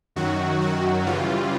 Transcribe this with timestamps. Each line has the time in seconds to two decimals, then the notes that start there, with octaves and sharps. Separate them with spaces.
0.16 F#2 D#3 F#3 F#4
0.61 F#4
1.06 C#3 E3 G3 F4